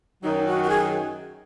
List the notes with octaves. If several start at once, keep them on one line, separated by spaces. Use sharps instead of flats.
F#2 D#3 F#3 D#4
F#4
F#4
G#4